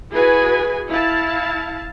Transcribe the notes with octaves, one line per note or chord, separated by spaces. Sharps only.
E4 F#4 G#4 B4 G#5
E4 F5 A5